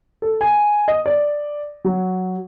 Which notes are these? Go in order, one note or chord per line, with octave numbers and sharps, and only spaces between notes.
A4
G#5
D#5
D5
F#3